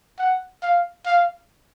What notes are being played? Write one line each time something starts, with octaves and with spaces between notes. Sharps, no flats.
F#5
F5
F5